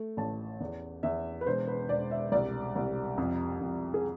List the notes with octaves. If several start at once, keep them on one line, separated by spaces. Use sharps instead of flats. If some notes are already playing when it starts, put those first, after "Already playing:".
Already playing: A3
A1 A5
E2
E2 E5
B4
E1 C5
B4
E1 D5
E5
C2 D5
C2
F2
F2
G#4